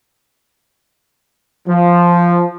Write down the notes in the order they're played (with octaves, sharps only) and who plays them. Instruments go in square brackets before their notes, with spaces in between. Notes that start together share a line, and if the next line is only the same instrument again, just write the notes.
[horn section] F3